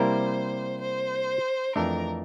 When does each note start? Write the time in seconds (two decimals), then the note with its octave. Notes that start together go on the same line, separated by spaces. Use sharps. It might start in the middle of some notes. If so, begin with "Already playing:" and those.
Already playing: C3 G3 A#3 E4 A#4 C5
0.81 C5
1.76 F2 E3 A3 D4 A#4